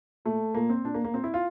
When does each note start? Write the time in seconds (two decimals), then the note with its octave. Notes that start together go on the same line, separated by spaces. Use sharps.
0.25 A#2 A3
0.55 A#2 A#3
0.70 C4
0.84 A#2 D4
0.94 A#3
1.05 A#3
1.14 A#2 C4
1.24 E4
1.34 F4